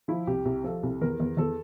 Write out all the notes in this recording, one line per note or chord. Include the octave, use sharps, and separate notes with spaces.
F3 E4
C2 G4
C2
F3 A4
C2
E2 A#4
E2
E2 A4